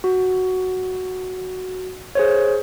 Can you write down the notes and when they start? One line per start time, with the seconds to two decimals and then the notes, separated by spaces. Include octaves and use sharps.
0.04 F#4
2.15 G#4 C5 C#5